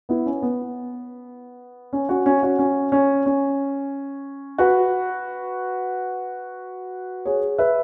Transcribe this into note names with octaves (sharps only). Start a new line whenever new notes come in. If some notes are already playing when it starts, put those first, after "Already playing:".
B3 E4
C#4
B3
C#4
C#4 F#4
C#4
C#4 F#4
C#4
C#4
C#4
F#4 B4
G#4 C#5
B4 E5